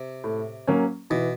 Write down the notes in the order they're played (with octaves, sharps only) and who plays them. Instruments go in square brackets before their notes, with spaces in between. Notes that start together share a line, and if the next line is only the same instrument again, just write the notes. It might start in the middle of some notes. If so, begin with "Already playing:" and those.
Already playing: [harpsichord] C3
[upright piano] A2
F#3 A#3 C#4
[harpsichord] B2 [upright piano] E3